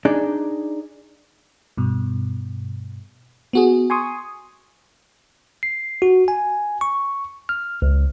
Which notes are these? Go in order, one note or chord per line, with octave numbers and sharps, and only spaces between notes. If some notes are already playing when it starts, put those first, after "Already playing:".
D4 D#4 G#4 D5
G2 B2
B3 F#4 G#4
G#5 C6 C#6 D#6
C7
F#4
G#5
C#6
F6
C#2